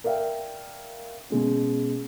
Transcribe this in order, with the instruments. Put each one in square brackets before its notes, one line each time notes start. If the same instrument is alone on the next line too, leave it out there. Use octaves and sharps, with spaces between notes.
[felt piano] A#4 D5 E5 F5 G5
B2 G#3 C#4